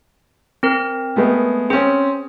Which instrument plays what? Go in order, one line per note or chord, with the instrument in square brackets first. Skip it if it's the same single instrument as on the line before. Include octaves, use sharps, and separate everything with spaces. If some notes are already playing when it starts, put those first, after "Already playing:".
[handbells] C4 A#4
[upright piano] G#3 A3 B3
[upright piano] C4 C#4 [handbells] G#4